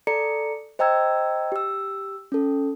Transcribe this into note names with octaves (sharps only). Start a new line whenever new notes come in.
A4 D5 A#5 C#7
C5 D#5 G5 A#5 E6 G#6
G4 E6
C#4 A4